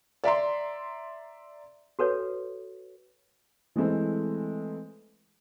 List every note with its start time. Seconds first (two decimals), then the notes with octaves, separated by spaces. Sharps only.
0.24 D5 E5 A#5 C6
1.99 F#4 A4 B4 C#5
3.76 E3 G#3 A3 C4 E4